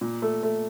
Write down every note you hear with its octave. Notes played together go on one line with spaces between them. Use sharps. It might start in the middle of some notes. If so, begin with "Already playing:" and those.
A#2
A3
A3